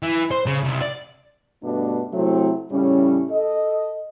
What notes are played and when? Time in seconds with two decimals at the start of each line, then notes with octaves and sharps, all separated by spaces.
0.03 E3
0.31 C5
0.47 C#3
0.63 C2
0.81 D5
1.62 G2 B2 A3 D4
2.13 C3 F#3 A3 C4 E4
2.71 A2 C#3 G3 C#4
3.29 A4 D#5